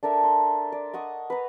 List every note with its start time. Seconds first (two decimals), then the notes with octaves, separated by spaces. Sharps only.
0.03 D4 A4 A#4 E5
0.23 C6
0.72 D5
0.94 D#5 F#5 C#6 D#6
1.30 B4 A#5